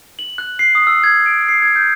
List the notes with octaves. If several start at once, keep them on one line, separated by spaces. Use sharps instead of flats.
F#7
F#6
C7
D#6
E6
G#6
D7
C7
G#6
G6